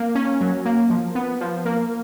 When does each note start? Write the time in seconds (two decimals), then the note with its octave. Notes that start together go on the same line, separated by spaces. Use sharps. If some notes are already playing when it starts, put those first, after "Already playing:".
Already playing: A#3
0.15 C#4
0.41 F#3
0.65 A#3
0.90 F3
1.15 B3
1.41 F3
1.65 A#3